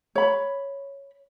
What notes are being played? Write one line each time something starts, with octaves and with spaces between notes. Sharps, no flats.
C#5 B5